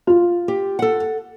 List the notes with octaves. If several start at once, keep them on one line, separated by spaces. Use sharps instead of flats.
F4
G4
A4 F#5